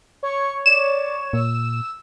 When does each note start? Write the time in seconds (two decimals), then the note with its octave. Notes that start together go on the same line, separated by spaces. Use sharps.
0.23 C#5 C#6
0.66 D5 E7
1.33 A#2 E6